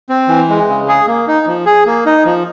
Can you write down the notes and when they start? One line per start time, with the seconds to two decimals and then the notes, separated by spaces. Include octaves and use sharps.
0.09 C4
0.28 E3
0.49 G#3
0.69 C#3
0.88 G#4
1.08 A#3
1.28 D#4
1.47 F3
1.66 G#4
1.86 A#3
2.06 D#4
2.26 F3